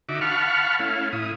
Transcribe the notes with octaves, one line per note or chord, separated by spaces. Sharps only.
D3 D#4 F#4 E5 D6
F5 F#5 A5 B5 C#6 F6
A3 C#4 E4 F5
A2 E4 D#6